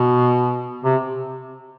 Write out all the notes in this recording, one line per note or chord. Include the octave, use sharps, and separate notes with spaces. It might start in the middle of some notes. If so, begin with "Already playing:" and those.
Already playing: B2
C3